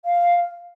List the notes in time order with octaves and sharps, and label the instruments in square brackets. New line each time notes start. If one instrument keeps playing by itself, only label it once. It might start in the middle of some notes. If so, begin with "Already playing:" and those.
[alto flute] F5